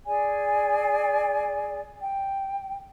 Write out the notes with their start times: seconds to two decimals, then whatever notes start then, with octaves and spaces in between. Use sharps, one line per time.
0.06 G#4 D5 G#5
2.00 G5